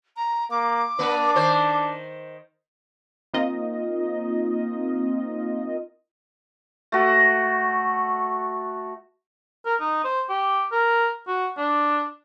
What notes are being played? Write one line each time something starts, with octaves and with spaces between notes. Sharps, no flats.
A#5
A#3 D6
A#3 D4 B4
D#3 C5
A#3 C4 D#4 F4 D#5
A3 F#4
A#4
D#4
C5
G4
A#4
F#4
D4